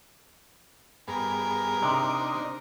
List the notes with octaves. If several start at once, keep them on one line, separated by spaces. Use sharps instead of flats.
G2 B3 G#4 A#4
C3 C4 D4 D#4